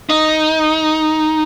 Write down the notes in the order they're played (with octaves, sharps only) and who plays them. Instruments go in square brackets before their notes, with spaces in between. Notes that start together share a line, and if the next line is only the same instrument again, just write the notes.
[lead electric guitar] D#4